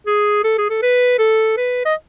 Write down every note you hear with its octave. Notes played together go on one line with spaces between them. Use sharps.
G#4
A4
G#4
A4
B4
A4
B4
D#5